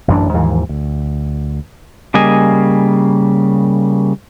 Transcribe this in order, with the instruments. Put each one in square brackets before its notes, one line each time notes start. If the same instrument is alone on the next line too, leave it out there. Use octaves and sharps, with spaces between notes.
[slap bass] A1 F#2 E3 D4
D#2 G#2 E3 F3
D2
[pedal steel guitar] C#3 G3 A#3 D#5 G#5